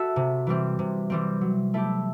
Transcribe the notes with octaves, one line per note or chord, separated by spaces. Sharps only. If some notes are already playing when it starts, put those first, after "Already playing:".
Already playing: F#4 A4 E5
C3
E3 G3 C4
C3
E3 G3 C4
F#3
A3 E4 G4